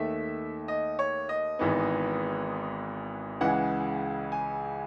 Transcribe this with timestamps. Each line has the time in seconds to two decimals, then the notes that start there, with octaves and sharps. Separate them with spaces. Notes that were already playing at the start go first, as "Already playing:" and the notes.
Already playing: D#2 D#3 A3 E5
0.68 D#5
0.99 C#5
1.29 D#5
1.59 G#1 G#2 E3 B3
3.41 C#2 C#3 E3 G#3 F#5
4.32 G#5